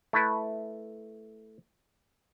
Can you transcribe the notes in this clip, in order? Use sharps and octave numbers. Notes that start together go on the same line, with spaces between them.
A3 E4 B4